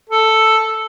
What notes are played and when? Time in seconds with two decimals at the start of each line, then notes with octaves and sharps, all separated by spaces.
0.10 A4